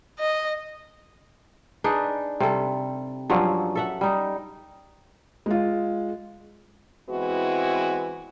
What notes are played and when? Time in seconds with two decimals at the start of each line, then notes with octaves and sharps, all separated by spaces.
0.19 D#5
1.84 D4 D#4 G#4 B4
2.40 C3 G3 A4
3.30 G2 F3 F#3 C#4
3.75 A4 E5 F#5
4.01 G3 D#4
5.46 G#3 F4
7.10 E3 G#3 B3 C4 E4 F#4